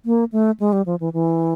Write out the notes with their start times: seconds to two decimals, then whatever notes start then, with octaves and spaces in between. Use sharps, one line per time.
0.05 A#3
0.32 A3
0.60 G#3
0.73 G3
0.86 F3
1.00 E3
1.13 E3